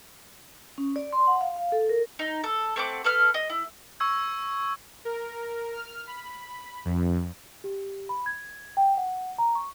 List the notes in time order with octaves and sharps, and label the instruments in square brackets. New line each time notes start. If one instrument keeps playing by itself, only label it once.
[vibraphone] C#4
D5
C6
F#5
F5
F5
A4
A#4
[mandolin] D#4
A4
A3 C4 F#5 D6
A4 B4 F6
D#5
E4
[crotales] C#6 E6 G#6
[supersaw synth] A#4
F6
B5
F2
[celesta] G4
B5
G#6
G5
F#5
A#5
C#6